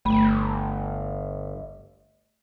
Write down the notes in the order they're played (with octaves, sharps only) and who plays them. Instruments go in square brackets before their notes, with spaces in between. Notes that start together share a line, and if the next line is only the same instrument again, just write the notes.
[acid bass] G1 [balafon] A3 B5